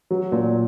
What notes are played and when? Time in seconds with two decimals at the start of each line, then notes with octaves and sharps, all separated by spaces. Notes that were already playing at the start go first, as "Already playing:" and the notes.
0.11 F#3
0.32 A#2